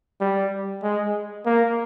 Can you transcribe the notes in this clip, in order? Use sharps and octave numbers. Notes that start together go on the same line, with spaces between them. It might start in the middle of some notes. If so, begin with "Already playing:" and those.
G3
G#3
A#3